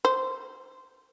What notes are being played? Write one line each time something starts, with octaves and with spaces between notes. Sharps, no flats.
C5